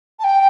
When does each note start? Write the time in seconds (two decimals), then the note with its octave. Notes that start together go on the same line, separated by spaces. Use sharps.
0.19 A5
0.24 G5